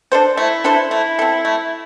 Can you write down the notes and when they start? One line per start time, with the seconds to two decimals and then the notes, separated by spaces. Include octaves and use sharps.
0.12 D4 A4 C5
0.37 A3 E4
0.64 D4 A4 C5
0.91 A3 E4
1.19 C4 A4
1.45 A3